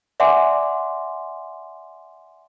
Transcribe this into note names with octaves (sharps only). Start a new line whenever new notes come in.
D5 E5 F#5 G#5 C6 D6